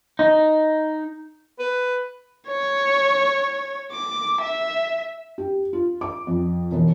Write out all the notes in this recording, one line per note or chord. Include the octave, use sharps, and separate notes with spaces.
D#4
B4
C#5
D6
E5
G4
F4
D6
F2
E1